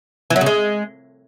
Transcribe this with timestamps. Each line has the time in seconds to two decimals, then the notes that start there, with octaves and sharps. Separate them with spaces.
0.30 E3
0.36 F#3
0.41 C#3
0.46 G#3